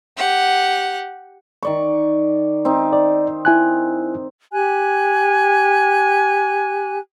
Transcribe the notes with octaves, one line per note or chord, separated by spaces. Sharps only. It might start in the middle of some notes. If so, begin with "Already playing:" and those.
G4 F#5
D#3 D5 C#6
C4 D#4
D5
E4 G#5 F#6
G4 G#5 F#6